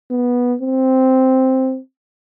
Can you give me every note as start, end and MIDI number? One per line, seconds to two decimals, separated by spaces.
0.11 0.55 59
0.61 1.79 60